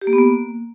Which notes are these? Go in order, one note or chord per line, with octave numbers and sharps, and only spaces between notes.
G4
A#3
B3
A#3